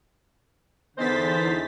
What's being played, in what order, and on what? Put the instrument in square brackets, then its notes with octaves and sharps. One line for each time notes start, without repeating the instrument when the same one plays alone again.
[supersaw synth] E2 A6 B6 [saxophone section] D3 D#4 C5